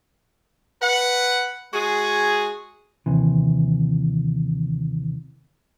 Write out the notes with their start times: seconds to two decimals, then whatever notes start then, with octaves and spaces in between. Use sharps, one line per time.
0.82 B4 F#5
1.74 G#3 F#4 G#4
3.06 D#2 C3 E3